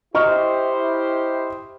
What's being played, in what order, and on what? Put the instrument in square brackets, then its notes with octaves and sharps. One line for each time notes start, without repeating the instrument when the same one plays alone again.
[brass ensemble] E4 G4 C5 [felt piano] D#5 C#6 F6